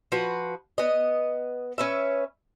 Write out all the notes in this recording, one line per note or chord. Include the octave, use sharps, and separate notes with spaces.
F3 F#4 B4
B3 D#5
C#4 B4 E5